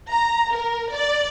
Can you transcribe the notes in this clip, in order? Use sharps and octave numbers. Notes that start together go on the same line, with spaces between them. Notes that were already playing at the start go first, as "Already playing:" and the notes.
A#5
A#4
D5